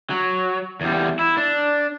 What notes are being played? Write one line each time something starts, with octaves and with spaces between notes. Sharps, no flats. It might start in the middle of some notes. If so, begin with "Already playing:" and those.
F#3
E2 G3
E4
D4